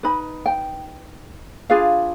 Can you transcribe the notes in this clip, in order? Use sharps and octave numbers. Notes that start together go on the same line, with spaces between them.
D#4 B4 B5
G5
D4 F4 G#4 B4 F5